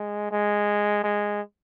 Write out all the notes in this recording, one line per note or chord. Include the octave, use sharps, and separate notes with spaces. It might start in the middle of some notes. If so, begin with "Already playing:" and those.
Already playing: G#3
G#3
G#3